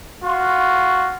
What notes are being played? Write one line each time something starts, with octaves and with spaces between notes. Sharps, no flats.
F4 F#4